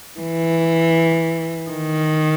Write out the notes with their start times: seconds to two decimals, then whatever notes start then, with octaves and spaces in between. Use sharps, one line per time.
0.20 E3
1.71 D#3